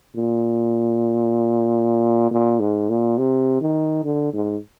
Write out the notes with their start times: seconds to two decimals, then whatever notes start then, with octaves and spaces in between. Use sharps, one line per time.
0.16 A#2
2.31 A#2
2.60 G#2
2.89 A#2
3.18 C3
3.61 D#3
4.04 D3
4.33 G#2